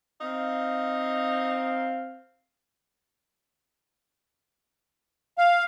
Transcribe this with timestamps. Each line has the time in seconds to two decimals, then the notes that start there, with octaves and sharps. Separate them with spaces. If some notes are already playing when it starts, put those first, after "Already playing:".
0.21 C4 D#4 F5
5.38 F5